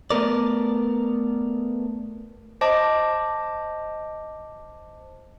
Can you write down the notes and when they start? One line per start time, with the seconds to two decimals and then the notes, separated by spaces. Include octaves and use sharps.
0.11 A3 B3 A#4 D5
2.61 C5 D#5 A5 D6